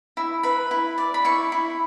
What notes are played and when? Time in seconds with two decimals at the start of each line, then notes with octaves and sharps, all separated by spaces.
0.17 E4
0.43 B4 B5
0.71 E4
0.98 D5
1.14 B5
1.25 E4 C#6
1.52 E4